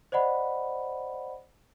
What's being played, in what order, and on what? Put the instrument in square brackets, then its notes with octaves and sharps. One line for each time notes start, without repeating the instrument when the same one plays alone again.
[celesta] C5 D5 D#5 F#5 B5